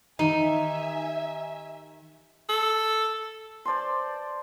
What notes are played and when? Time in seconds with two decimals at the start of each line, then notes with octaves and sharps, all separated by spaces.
0.19 D#3 D#4 G4 E5 G#5
2.49 A4
3.65 C5 D5 A5 C6